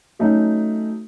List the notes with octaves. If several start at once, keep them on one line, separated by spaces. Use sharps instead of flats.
F#3 A3 C#4 D#4